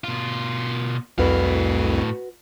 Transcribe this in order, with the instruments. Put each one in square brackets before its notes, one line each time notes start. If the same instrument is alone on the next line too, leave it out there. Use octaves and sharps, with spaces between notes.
[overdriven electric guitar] B2 F4
[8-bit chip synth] C2 F2 [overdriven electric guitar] A2 F5 [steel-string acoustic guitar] F#4 B4